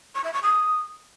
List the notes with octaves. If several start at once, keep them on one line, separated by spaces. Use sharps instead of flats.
C#6
E5
C#6
D#6